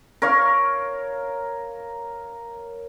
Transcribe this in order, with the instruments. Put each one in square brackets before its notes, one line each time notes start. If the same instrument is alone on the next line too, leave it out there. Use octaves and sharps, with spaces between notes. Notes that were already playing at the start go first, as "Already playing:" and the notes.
[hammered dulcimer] A#4 C#5 F5